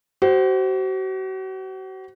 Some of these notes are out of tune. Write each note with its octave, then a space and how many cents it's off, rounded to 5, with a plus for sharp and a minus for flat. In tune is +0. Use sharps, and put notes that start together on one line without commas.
F#4 +40 C5 +0